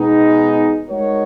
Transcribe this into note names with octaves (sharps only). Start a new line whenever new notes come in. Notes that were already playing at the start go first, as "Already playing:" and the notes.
Already playing: B2 G#3 B3 D#4
G#3 D#4 F#4 A#4 C#5